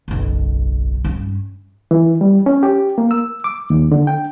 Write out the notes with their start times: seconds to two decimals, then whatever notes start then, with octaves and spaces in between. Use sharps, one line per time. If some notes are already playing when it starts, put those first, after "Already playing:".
0.08 F#1 B1
1.04 G2 C#4
1.91 E3
2.21 G3
2.46 C#4
2.63 G4
2.98 A#3
3.11 E6
3.44 D6
3.70 D#2
3.92 D3
4.07 G5